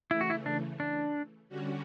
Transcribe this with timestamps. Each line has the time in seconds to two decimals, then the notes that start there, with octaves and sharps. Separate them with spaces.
0.11 C#3 E3 A3 E4
0.21 F#4
0.30 E4
0.46 D4
0.80 D4
1.49 D3 G3 C#4 F#4